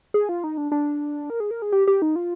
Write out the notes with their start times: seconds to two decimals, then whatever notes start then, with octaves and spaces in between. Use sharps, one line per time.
0.14 G#4
0.29 F4
0.44 D#4
0.58 D4
0.72 D4
1.30 A#4
1.40 G#4
1.51 A#4
1.62 G#4
1.72 G4
1.87 G4
2.02 D#4
2.16 F4